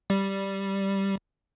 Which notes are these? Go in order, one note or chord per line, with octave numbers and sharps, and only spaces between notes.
G3